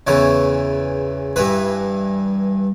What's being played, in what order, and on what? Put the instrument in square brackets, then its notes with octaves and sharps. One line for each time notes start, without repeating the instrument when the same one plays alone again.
[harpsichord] E2 C#3 E3 C#5
G2 E3 B4